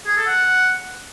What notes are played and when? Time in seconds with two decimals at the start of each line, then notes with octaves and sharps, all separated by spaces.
0.07 G#4
0.17 A4
0.27 F#5